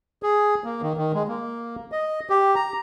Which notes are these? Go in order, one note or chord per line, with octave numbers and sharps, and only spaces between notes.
G#4
A#3
D#3
D#3
G#3
A#3
D#5
G4
A#5